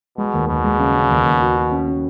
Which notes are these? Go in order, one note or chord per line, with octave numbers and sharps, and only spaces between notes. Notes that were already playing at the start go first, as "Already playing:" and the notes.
B2 G#3
D#2
D#2 B2
G#3
C#3
C#3
D#2
D#2
F#4
F#4
C#4
C#4